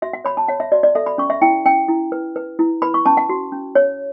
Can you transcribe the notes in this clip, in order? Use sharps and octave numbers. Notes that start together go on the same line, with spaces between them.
F#4 E5
F#5
C#5 B5
A5
C#5 F#5
E5
F#4 D5
D5
A4 E5
B5
C#4 C#6
E5
E4 G5
C#4 G5
E4
B4
B4
E4
B4 B5
C#6
C#4 A5
F#5
F#4
C#4
C#5